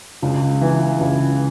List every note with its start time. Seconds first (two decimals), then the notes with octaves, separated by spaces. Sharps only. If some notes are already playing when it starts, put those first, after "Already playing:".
0.22 C#2
0.61 E3
1.00 C#2